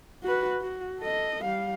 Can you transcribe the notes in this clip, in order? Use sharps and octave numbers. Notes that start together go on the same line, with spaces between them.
F#4 B4
F#4
A4 D#5
G3 F5